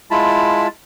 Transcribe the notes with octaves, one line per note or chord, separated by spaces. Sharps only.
G#3 E4 F4 A5 B5